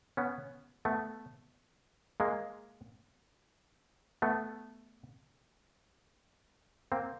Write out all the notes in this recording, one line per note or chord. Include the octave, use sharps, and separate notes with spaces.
B3 C#4
A3 B3
G#3 A#3
A3 B3
A#3 C4